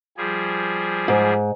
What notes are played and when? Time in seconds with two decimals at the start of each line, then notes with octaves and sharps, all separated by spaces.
0.17 F3 G3 G#4
1.08 G#2